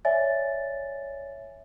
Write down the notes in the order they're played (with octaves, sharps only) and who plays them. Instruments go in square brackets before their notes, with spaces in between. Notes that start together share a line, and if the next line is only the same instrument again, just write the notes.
[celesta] C#5 D5 E5 G#5 A6